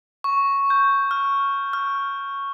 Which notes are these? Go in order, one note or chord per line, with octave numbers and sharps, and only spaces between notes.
C#6
G6
F6
F6